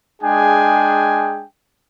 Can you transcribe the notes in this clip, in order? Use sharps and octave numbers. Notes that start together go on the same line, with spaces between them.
G#3 D4 G#4 G5 G#5